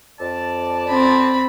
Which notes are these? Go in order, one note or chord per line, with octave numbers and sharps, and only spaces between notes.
F2 D5 A5
C4 B5